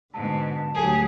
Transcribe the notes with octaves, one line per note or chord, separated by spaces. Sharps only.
G#2 B2 D3 A5
D2 F#3 G4 G#4